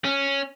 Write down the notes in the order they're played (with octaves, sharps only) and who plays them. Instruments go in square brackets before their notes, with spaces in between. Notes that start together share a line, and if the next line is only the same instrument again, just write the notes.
[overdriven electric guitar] C#4